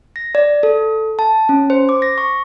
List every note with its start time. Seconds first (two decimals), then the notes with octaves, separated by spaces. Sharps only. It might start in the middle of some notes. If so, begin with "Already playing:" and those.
0.16 A#6
0.35 D5
0.63 A4
1.19 A5
1.49 C#4
1.70 C5
1.89 D6
2.02 A#6
2.18 C#6